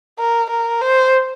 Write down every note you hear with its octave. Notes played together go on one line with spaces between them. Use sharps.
A#4
A#4
C5